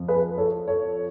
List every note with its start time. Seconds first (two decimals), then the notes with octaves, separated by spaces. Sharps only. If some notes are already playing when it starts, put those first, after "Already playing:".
Already playing: F2 F3
0.08 G#4 B4
0.38 A4 C#5
0.68 A4 C#5